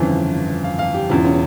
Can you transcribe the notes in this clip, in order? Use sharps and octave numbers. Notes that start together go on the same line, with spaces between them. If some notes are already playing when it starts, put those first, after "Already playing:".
Already playing: G1 F2 C#3 E3
F5
F5
G4
E1 E2 C#3 F4
C#4